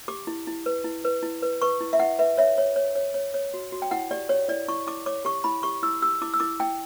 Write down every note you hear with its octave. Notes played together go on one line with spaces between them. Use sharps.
G4 D6
E4
E4
B4
E4
B4
E4
B4
B4 C#6
E4
E5
E4 F#5
B4 E5
C#5 E5
C#5
C#5
C#5
C#5
C#5
F#4
F#4
G5
E4 F#5
G4 D5
G4 C#5
E4 D5
E4 C#6
E4 D6
C#5 D6
G4 C#6
E4 B5
G4 C#6
E4 E6
G4 E6
E4 D6
E6
E4 D6
E4 G5